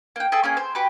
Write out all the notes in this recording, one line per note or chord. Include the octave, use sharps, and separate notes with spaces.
A#3 G5
G#4 A4 E5 G5
A#3 C#4 G#4
C5
F#4 G4 B4